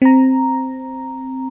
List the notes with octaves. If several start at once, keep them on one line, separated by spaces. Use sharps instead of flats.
C4 A#5